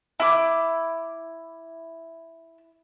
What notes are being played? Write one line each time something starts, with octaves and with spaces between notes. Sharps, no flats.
E4 D6